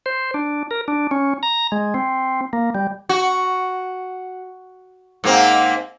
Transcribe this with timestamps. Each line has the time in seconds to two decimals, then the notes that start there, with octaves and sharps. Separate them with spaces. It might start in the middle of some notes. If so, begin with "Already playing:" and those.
0.06 C5
0.34 D4
0.71 A#4
0.88 D4
1.11 C#4
1.43 A#5
1.72 G#3
1.94 C4
2.53 A#3
2.75 G3
3.09 F#4
5.24 G#2 A#3 C4